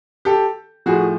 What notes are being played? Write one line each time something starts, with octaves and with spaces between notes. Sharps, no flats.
G4 A4
A2 F3 F#4 G#4